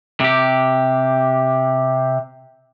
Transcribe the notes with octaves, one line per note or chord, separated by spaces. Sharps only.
C3 G4